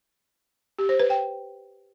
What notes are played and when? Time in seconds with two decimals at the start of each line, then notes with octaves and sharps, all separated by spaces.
0.79 G4
0.89 C5
0.99 B4
1.10 G5